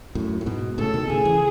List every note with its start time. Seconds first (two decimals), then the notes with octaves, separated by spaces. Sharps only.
0.15 F#2 A2
0.41 A2
0.46 G#2 B2
0.78 A2 C#3 A4
0.94 B2 D#3
1.09 A2 C#3 G#4
1.25 C#3 E3